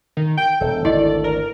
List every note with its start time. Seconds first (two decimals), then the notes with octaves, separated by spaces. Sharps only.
0.17 D#3
0.38 G5 G6
0.61 E1 A4
0.85 G#1 D2 E4 D5 D#5
1.24 A#4